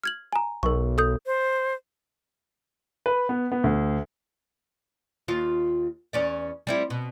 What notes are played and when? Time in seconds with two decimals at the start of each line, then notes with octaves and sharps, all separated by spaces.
0.04 F6 G#6 F#7
0.33 G#5 A#5
0.63 B1 A#4 C#6
0.98 A4 D#6 G6
1.26 C5
3.06 B4
3.29 B3
3.52 B3
3.64 D2
5.28 D#2 F4
6.13 E2 C#4 D5
6.67 G3 C4 E4
6.90 B2